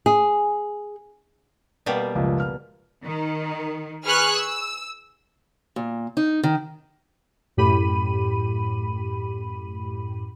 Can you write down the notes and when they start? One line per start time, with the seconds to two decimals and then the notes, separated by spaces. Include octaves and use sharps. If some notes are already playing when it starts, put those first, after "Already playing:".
0.06 G#4
1.86 B2 G3 A#3
2.15 F#1 C#2 F3
2.40 F6
3.05 D#3
4.05 G#4 B4 C#6 F6 F#6
4.36 E6
5.76 A#2
6.17 D#4
6.43 D#3
7.57 F#2 A2 G4 B5 D#7